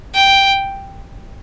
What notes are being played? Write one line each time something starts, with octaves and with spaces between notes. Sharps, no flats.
G5